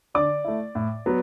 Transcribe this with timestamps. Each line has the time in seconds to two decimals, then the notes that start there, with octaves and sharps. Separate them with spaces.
0.14 D3 D5 D6
0.44 A3 E4
0.75 A2
1.06 F#3 B3